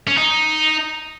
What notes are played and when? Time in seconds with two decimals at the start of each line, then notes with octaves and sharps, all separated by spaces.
0.07 C#4
0.17 D#4